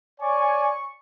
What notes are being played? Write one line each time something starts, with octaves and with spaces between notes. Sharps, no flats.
C#5 D5 G#5 C#6